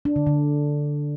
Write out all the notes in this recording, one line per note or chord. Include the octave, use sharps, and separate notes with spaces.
D4
D3
D3